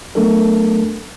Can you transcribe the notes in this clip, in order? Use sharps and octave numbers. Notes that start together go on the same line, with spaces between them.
F#3 A3 B3 D4 A4 A#4